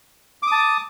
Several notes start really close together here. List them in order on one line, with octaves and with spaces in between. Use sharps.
D6 D#6 A5